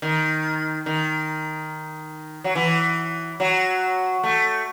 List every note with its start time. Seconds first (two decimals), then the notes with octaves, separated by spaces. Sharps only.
0.02 D#3
0.86 D#3
2.44 F#3
2.55 E3
3.40 F#3
4.23 A3